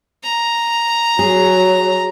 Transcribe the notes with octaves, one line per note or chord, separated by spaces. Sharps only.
A#5
F#3 G#4